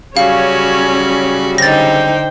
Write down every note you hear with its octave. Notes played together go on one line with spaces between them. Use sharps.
C#3 F#3 G3 C#4 F#4 C#5 F5
D3 D#4 C5 G5 A6 A#6